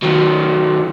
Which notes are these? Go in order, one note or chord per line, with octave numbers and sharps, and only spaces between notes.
D#3 F#3